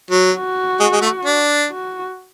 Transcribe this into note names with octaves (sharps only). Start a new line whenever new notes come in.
F#3
F#4
G#3
G#3
A3
D4
F#4